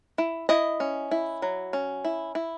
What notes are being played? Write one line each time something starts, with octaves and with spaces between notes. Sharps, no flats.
E4
E4 D#5
C#4
E4
F#3
C#4
E4
E4